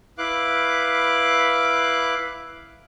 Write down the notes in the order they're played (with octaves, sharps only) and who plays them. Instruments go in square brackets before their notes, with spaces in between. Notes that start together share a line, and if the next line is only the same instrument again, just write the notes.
[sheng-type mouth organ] E4 B4 F5 D6 F#6